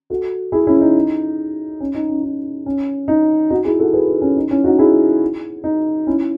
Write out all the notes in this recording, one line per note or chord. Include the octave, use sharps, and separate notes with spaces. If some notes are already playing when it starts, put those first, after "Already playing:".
F#4 A4
E4 G#4
C#4 E4
D#4
C#4
D#4
C#4
D#4
C#4
D#4
D#4 F#4
E4 G#4
F#4 A4
G#4 B4
D#4
C#4
D#4
C#4 E4
D#4 F#4
E4 G#4
D#4
C#4 E4